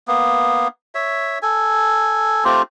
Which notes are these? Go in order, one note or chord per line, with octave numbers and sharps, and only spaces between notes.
A#3 B3
C#5 E5
A4 G#5
A3 C4 F4 G4